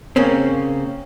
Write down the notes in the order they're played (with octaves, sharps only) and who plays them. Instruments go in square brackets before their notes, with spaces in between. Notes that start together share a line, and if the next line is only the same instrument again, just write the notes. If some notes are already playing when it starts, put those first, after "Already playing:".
[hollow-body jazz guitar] C#3 A#3 C4 C#4